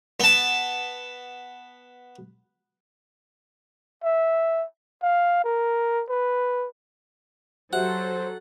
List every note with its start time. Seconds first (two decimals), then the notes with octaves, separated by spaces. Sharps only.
0.20 B3 A5
4.04 E5
5.03 F5
5.44 A#4
6.09 B4
7.73 F#3 F#4 G4 A4 C5 E5 F#5